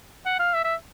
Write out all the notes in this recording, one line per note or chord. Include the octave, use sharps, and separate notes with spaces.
F#5
F5
E5
E5